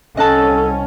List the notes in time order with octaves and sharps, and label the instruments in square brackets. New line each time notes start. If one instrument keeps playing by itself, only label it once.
[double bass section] C2 C#4 [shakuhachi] A4 [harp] D#5 F#5 A5